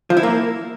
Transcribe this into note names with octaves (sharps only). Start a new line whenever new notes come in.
F3
E4
A#3